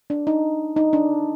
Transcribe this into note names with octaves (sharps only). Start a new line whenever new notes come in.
D4
D#4
D#4
D4